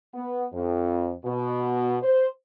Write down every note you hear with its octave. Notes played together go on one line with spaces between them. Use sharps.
B3
F2
B2
C5